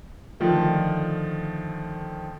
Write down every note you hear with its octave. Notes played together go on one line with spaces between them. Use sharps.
D3 D#3 F3 A3